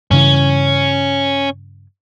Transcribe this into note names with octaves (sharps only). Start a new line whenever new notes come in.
G2 C#3 E3 C#4